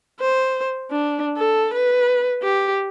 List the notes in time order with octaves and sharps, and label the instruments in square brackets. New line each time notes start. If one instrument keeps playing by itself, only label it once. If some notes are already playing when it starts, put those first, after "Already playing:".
[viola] C5
D4
A4
B4
G4